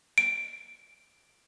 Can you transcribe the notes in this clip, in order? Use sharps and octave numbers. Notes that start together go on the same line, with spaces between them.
D7